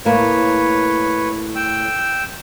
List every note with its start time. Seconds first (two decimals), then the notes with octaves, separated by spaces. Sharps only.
0.05 A2 A#3 B4 C#5
1.56 G5 E6